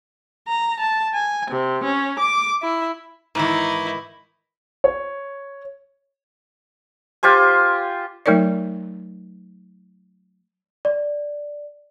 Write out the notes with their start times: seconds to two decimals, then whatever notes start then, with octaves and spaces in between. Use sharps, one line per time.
0.47 A#5
0.80 A5
1.14 G#5
1.50 C3
1.83 C#4
2.20 D6
2.61 E4
3.35 G#2 D#3 E3 D#4 E4
4.84 C#5
7.23 F4 G4 C5 G#5
8.26 F#3 A3 D#4 A#4 C#5 D5
10.85 D5